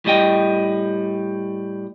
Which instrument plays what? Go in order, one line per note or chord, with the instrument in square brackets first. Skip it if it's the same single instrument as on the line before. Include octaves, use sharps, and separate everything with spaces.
[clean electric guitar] A2 G3 D#5 G5